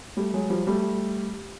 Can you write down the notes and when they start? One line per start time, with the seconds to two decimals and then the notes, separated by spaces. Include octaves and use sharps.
0.16 G3 A3
0.34 F#3 G#3
0.50 F3 G3
0.67 G3 A3